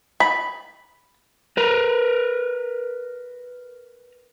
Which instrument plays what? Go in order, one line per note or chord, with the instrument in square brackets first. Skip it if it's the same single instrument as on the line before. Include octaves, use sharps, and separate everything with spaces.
[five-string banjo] B5
[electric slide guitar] A#4 B4